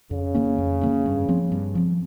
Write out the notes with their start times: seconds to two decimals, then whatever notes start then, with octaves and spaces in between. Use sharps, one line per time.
0.11 F2 C#3
0.35 D#3 A#3 C#4
0.58 F2
0.81 D#3 A#3 C#4
1.06 G2
1.28 F3 C4
1.52 G2
1.75 F3 C4